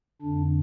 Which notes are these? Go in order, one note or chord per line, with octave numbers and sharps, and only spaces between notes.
F2 D3 D4